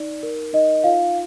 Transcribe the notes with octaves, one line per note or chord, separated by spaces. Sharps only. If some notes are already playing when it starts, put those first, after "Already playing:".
Already playing: D#4 D5
A#4
D#4 D#5
F4 F5